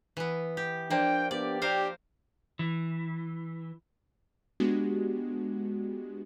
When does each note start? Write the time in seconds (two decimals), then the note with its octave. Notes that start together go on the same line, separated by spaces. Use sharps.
0.17 E3 B3
0.57 G4
0.90 F3 A#3 D4 G5
1.31 B3 D4 G4 D5
1.62 D4 G4 A#4 C5 F5
2.59 E3
4.60 G#3 B3 D4 F#4 G4